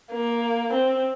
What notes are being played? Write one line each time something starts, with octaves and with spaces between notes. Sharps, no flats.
A#3
C4